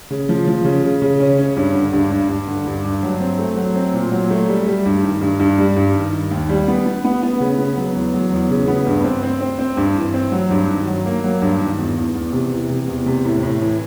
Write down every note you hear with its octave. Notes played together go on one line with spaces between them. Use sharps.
C#3
F3
F3
C#3
C#3
C#3
C#4
C#4
G2
D3
G2
G2
G2
D3
G2
G2
F#3
C4
A3
F#3
C4
A#2
F#3
A3
G3
G3
G2
D#3
G2
G2
G3
G2
D#3
D#3
D#2
G3
B3
B3
B3
B3
C#3
B3
F#3
E2
F#3
E2
C#3
B3
G2
C4
C4
C4
C4
G2
E3
C4
F#3
G2
D#3
F#3
A#3
F#3
G2
D#3
E2
E2
E2
C3
E3
C3
E2
C3
A2
A2
E3